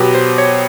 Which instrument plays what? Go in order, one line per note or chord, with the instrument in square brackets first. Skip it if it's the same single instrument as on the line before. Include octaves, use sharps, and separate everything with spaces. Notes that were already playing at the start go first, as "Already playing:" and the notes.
Already playing: [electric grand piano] B2 F#3 B3 G4
C5
C#5